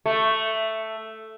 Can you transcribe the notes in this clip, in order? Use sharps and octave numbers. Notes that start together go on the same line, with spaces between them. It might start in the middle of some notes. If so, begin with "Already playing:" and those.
A3